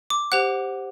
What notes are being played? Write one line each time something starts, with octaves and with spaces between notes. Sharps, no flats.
D6
G4 C5 F#5 F#6